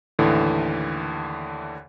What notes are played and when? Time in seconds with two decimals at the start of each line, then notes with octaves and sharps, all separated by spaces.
0.19 D#2 A2 D3 E3